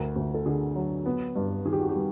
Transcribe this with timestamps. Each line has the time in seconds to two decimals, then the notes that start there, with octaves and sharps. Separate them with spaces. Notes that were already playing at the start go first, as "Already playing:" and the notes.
Already playing: D2 A#4
0.16 D2
0.34 A4
0.46 D3 G#4
0.76 F#3
1.06 B3
1.36 G2
1.65 D#3 G#4
1.73 G4
1.81 F#4
1.89 G4
1.95 G3